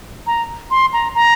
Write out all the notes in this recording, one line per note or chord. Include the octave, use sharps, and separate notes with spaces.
A#5
C6
A#5
A#5